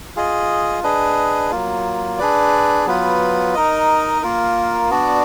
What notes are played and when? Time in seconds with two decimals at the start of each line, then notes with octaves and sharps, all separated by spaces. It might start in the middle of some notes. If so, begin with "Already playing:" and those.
0.16 F4 G#4 D#5
0.84 D4 G#4 B4 D#5
1.51 F#3 A#3 F4
2.19 D4 G#4 B4 D5
2.86 F#3 B3 F4 B4
3.54 D#4 A#4 D#5
4.22 A#3 F4 A#4
4.90 B3 D4 F#4 D5